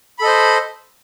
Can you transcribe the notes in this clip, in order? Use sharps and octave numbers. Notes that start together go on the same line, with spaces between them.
A4 C5 D#5 B5